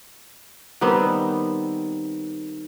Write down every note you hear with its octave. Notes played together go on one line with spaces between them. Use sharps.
D#3 G3 B3 C4